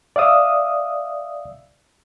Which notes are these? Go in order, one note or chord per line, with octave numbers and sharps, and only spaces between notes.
D5 E5 F5 D#6 E6